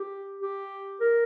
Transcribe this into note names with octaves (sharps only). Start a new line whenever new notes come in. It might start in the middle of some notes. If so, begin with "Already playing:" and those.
Already playing: G4
G4
A#4